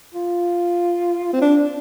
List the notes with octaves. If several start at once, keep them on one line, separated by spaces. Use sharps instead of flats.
F4
C4
D4